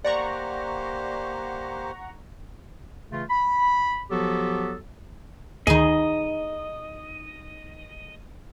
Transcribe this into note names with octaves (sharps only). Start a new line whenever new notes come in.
A#3 G4 C5 D5 F#5 A#5 C#6
C#3 E3 A3 F4
B5
F3 F#3 B3 F#4 G4 A4
D2 D#3 D#4 G#4 D#5